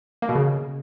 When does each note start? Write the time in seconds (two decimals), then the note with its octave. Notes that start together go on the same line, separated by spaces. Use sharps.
0.22 A#3
0.29 B2
0.35 C#3